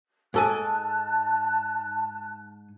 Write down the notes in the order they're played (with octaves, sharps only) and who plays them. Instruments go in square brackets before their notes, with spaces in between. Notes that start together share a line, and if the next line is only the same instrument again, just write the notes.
[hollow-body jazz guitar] G#2 A4 G#5 [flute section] A5 F#6